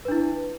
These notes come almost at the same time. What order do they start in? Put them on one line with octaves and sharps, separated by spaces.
B4 D4 E4